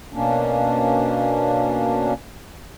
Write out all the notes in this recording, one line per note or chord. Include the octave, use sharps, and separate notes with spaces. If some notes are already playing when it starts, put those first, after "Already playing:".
B2 A#3 C#4 D4